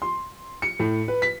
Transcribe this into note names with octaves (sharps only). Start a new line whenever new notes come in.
C6
C#7
A2
B4
B6